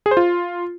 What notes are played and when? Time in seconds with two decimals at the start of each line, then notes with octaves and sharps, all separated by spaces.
0.06 G#4
0.11 C5
0.17 F4